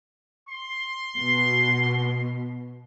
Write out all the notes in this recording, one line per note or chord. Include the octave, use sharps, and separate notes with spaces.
C6
B2